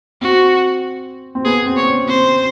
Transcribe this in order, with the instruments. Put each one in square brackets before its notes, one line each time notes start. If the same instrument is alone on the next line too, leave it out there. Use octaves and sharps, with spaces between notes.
[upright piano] C4 [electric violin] F#4
[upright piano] C4
[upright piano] B3 [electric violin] G#4
[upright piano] C4
[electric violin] C#5
[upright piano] C4
C#4
[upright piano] C4 [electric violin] C5